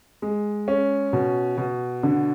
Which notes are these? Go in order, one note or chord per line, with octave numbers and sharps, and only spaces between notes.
G#3
C#4
B2
B2
D3